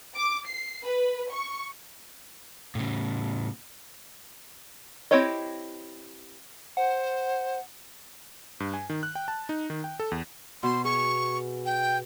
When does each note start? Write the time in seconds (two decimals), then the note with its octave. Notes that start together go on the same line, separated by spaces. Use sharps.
0.15 D6
0.47 C7
0.84 B4
1.31 C#6
2.75 A2 C#3
5.11 C4 E4 G4 C#5 D#5
6.77 C5 F#5
8.60 G2
8.74 G#5
8.90 D#3
9.03 F#6
9.15 G5
9.28 A5
9.49 D#4
9.70 D#3
9.84 G5
10.00 A4
10.12 E2
10.63 B2 C6
10.85 G#4 C#6
11.66 G5